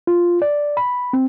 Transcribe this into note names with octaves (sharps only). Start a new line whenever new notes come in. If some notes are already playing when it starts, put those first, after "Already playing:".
F4
D5
B5
C4